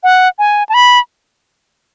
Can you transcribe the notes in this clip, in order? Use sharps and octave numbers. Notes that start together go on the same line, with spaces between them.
F#5
G#5
A5
B5